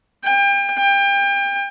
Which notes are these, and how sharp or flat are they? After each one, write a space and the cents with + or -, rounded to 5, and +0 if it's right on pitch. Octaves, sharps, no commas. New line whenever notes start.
G5 +35
G5 +30